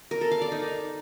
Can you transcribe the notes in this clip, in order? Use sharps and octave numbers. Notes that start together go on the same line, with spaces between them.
A#4
A4
F5
D5
D#4